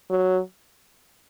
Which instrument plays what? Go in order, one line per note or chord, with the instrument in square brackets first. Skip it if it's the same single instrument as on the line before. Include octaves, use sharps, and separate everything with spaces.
[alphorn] F#3